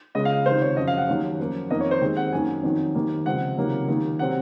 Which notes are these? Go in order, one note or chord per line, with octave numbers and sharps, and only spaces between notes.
C#2 C#3 G#3 D#5
F5
C#2 C3 D#3 C5
C#5
F#2 C#3 F3 D#5
F5
F#5
D#2 D#3 F#3
F#2 F3 A#3
F2 D#3 A#3 D#5
C#5
C5
D#2 D#3 G#3 C4
F#5
F#2 D#3 A#3 G#5
F2 D#3 F#3
D#2 D#3 A#3
C#2 C3 F3 C4 F#5
C#2 C3 D#3 F#3 A#3
D#2 D#3 A#3
C3 F#3 C4 F#5